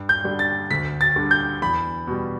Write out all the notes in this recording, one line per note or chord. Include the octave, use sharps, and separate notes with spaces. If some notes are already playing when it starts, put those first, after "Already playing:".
Already playing: G2
G6
D3 G3 D4
A6
D2 B6
A6
D3 G3
G6
E2 B5
B2 G3